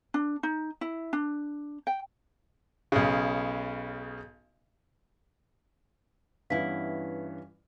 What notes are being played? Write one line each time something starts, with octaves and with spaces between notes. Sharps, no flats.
D4
D#4
E4
D4
G5
B1 C#3
G2 E3 B3 C#4 E4 F5 B6